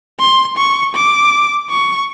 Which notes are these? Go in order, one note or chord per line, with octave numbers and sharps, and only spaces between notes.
C6
C#6
D6
C#6